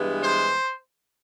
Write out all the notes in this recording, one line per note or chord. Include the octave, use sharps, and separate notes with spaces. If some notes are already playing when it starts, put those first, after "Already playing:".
Already playing: G2 E3 G#3 B3
C5